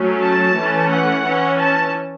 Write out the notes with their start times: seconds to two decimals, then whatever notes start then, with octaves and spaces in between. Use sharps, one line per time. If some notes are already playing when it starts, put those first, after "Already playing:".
Already playing: F#3 A3 C#4
0.23 A5
0.57 E3 A3 C#4
0.90 F#5
1.23 E3 C#4
1.57 A5